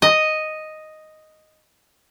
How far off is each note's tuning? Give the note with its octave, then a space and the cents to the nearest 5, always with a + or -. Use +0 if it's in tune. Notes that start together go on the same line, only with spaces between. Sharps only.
D#5 +0